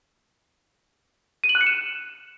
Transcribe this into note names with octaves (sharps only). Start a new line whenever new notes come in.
D#7
F#7
F#6
C#7
E7